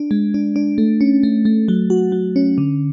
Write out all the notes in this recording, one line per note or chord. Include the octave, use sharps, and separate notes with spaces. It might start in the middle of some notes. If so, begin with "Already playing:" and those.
Already playing: D4
G#3
D4
D4
A3
C#4
A3
A3
F#3
F#4
F#3
C#4
D3